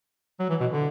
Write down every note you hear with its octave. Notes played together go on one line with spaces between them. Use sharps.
F#3
E3
B2
D3